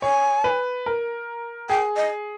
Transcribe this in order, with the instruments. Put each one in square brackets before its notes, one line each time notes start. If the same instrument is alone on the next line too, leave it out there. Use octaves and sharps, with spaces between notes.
[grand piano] C#5 [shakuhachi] G#5
[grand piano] B4
A#4
[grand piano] G#4 [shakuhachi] G5
[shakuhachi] D#5